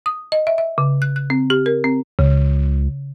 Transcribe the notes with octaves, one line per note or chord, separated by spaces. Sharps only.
D#6
D#5
E5
E5
C#3
F#6
F#6
C4
G4
A#4
C4
C#2 C#3